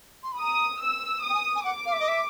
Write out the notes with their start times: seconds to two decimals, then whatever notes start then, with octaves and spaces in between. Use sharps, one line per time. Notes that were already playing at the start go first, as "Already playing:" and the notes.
0.22 C6
0.32 B5
0.39 A#5 D#6
0.81 E6
1.22 D#6
1.29 G5
1.33 G#5
1.54 G#5
1.64 F#5 D6
1.85 F5
1.92 E5
1.99 D#5
2.07 E5